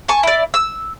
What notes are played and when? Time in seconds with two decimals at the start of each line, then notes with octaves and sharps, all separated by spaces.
0.08 G#5 A5 C#6
0.23 E4 D5
0.54 E6